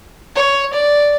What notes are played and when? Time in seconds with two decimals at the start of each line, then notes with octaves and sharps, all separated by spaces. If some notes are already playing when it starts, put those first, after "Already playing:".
0.35 C#5
0.73 D5